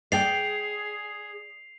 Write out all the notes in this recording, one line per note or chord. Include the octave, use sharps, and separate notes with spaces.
G#4 D5 G5 C7 F7